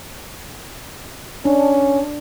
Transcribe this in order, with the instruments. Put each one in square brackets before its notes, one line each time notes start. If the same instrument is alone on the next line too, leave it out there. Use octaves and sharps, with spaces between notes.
[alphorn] C#4 [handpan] D4